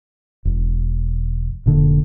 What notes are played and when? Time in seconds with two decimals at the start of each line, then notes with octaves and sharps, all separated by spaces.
0.45 E1
1.66 F1 A#2 D3